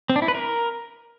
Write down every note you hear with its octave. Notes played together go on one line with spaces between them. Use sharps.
C4
D4
E4
B4
A#4